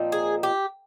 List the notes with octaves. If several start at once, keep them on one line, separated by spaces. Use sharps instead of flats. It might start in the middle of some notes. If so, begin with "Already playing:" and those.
Already playing: A#2 F3 C4 D#4
G#4
G4